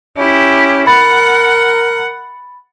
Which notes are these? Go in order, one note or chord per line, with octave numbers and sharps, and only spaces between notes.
C#4 E4 G4
A#4 F#5 B5 A6